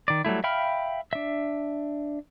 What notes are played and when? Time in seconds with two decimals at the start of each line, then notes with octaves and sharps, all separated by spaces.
0.08 D#3 D5
0.25 F#3 G3 A3 E4
0.44 E5 F5 G5 B5 F6
1.13 D4 E5